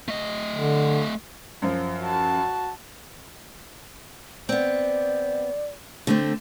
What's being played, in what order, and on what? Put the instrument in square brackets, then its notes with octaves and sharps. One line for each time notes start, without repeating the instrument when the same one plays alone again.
[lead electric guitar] A3 D#5
[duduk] D3
[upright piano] F#2 F3
[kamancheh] F#4 A5
[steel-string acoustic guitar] B3 C4 [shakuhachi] D5
[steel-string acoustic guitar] D3 A3 C4